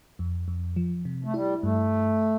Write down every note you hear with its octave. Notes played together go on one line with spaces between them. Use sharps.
F2
F2
F3
C3
A3
G3 E4
G2 A3